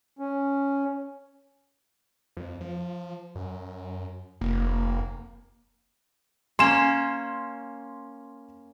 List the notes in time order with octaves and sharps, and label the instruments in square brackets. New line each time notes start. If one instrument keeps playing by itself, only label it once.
[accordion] C#4
[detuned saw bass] F2
F3
F#2
[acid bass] F1 [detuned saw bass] A#3
[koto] A#3 C#4 [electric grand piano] C6 E7